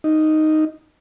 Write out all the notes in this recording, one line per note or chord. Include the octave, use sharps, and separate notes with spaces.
D#4